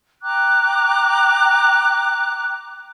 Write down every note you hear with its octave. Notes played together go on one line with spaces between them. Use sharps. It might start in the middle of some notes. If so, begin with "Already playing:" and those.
G5 A#5 D6 F#6